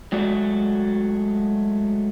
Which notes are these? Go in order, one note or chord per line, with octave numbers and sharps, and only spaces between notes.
F#3 G#3 A3 F#4 D5